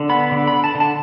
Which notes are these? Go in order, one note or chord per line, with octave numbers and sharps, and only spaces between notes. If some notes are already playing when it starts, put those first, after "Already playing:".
Already playing: D3
B3 B5
D3
B5
D3
A5
D3
A5